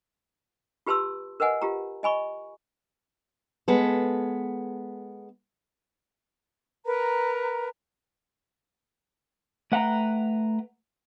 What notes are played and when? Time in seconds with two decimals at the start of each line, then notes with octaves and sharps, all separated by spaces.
0.86 F4 G4 B4 A5 C6 E6
1.40 A#4 B4 D#5 F#5 G#5
1.62 F4 G4 A#5
2.03 D#5 G#5 B5 C#6
3.68 G#3 B3 A4
6.85 A#4 B4 A#5
9.72 A3 B4 F#5 G5 A5 A#5